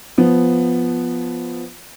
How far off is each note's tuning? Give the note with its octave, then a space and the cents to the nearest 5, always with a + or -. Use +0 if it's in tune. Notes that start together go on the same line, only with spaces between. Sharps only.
F3 +0 B3 +0